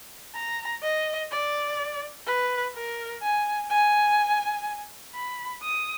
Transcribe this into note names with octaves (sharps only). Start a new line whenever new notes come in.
A#5
D#5
D5
B4
A#4
G#5
G#5
B5
D#6